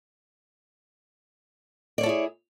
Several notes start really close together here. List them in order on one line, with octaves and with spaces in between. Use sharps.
D5 C#5 A4 E4 G#4